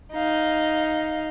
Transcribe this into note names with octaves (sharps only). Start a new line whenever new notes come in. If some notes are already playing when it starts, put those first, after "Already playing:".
D#4 F5